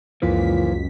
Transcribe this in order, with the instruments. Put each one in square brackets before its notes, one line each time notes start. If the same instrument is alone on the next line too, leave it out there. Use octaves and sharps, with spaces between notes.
[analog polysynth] C#2 F#2 B6 [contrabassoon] A#2 [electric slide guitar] E3 F3